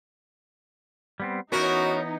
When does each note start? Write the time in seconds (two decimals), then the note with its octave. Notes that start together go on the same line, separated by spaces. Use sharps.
1.20 G3 B3 C4
1.52 E3 B3 C#4 D#4 F#4 A#4